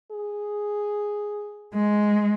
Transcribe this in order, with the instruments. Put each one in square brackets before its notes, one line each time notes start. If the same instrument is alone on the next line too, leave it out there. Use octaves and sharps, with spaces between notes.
[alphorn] G#4
[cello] G#3